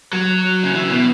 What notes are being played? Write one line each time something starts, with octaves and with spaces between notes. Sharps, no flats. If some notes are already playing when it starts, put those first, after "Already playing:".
F#3
C#3
E3
B2